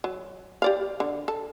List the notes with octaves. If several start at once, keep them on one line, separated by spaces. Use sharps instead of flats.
F#3
G4 D5 F5
D3
A4